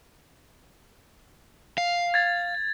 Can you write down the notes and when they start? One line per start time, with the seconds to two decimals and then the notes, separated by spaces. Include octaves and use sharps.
1.78 F5
2.14 G#6 A6